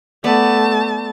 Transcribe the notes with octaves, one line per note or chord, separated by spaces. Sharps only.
A3 B3 D5 A5